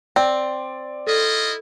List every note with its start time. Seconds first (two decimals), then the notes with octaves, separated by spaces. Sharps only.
0.16 C4 D5
1.07 E4 F4 A4 D#5